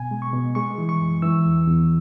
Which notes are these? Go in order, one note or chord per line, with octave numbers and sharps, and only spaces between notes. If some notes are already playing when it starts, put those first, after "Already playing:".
Already playing: B2 G#5
G#3
C#6
B2
G#3 C#6
E3
C#6
F#2
E3 E6
E2
E2